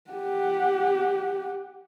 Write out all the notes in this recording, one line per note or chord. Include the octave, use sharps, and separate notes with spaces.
G4 F#5